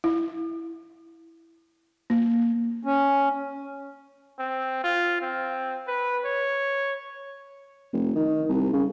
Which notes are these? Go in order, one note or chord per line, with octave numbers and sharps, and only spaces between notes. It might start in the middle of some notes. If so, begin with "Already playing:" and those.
E4
A#3
C#4
C4
F4
C4
B4
C#5
F1
D#3
C2
C#3